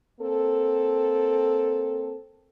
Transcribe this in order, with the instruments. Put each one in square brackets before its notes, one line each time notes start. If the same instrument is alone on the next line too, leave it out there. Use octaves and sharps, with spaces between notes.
[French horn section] A#3 C4 A4